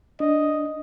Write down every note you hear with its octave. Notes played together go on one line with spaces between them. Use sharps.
D4 D#5